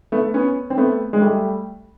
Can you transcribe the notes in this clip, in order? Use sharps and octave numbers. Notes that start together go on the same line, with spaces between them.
A3 B3
B3 C#4
C4
A3 B3
G#3
G3 A3